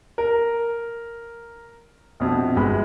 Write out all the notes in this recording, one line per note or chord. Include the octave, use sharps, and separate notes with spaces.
A#4
A#1 F2 B2
G1 G#3 B5